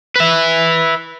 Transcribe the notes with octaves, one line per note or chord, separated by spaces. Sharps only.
B4 E5